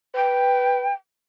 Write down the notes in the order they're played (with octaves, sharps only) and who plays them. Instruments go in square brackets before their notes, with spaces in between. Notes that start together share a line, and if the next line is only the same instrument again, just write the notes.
[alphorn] B4 [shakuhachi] G5